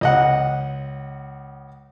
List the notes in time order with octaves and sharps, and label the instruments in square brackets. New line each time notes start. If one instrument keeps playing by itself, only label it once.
[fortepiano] C#2 D#5 F#5